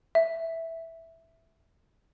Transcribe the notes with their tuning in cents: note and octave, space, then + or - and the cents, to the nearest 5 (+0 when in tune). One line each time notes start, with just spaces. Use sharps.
E5 -5